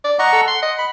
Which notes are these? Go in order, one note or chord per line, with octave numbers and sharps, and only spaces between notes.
D5
D#5 F#5 A#5 C#6
A4
F#5 C6
D#5
B5